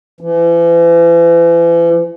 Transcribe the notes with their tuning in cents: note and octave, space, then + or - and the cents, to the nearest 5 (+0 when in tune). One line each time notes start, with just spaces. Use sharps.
E3 +40